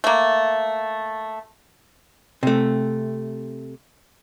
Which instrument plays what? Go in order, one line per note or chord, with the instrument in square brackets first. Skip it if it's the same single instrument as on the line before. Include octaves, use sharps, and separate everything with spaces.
[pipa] A3 A#3
[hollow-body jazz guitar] C3 A3